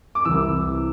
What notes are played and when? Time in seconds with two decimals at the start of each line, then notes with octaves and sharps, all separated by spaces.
0.15 D6
0.25 C2 C3 E3 E6